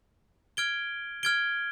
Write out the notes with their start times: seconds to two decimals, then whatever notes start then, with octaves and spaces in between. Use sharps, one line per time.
0.57 F6 G#6 D7 G7
1.23 F6 G#6 D7 G7